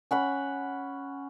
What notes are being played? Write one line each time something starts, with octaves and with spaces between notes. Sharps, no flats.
C#4 F#5 B5